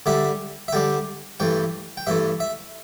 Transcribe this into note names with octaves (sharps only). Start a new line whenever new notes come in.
D3 G3 D4 E5
E5
D3 G3 D4 G5
G2 E3 A3 G5
G5
G2 E3 A3 E5
E5